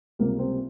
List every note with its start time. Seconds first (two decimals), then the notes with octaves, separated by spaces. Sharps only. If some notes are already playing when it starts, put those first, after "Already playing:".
0.19 C#2 C3 G3 A#3
0.39 C4